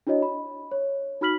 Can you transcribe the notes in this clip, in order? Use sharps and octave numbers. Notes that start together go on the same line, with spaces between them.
D4 E4 F#4 C#5 D#5
B5
C#5
D#4 F#4 B5 F6 B6 F#7